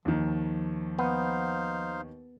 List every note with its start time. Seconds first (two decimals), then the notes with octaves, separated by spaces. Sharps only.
0.05 D#2 D#3 F3
0.99 B3 D#4 C5 F5